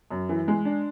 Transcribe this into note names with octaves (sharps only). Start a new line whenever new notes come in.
F#2
E3
G#3
D4